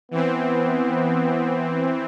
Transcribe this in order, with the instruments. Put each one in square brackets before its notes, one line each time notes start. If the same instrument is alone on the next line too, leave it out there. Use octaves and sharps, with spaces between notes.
[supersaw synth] E3 C4 [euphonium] B3